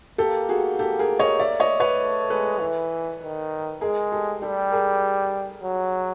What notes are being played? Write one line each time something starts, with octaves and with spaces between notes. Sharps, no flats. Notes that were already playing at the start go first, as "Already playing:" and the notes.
A#3 G4 A4
F#4 G#4
G4 A4
G#4 A#4
C#5 D#5
D5 E5
C#5 D#5
B4 C#5
A3
G#3 A4 B4
E3
D#3
G#3 G#4 A#4
G4 A4
G3 G4 A4
G#4 A#4
F#3